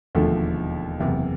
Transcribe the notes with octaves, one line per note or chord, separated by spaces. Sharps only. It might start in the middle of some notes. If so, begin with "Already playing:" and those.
E1 D#2 D3 F3 A3
F#1 E2 C3